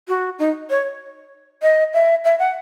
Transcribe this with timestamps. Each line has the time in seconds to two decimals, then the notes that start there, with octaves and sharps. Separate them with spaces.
0.08 F#4
0.39 D#4
0.70 C#5
1.62 D#5
1.94 E5
2.25 E5
2.39 F#5